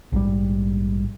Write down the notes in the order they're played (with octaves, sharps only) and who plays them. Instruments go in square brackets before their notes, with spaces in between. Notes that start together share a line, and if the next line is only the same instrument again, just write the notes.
[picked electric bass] A#1 G#2 G3